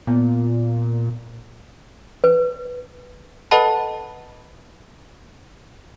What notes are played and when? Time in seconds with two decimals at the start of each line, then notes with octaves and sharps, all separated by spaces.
0.07 A#2 B3
2.24 B4
3.51 A4 B4 D#5 F#5 A5 B5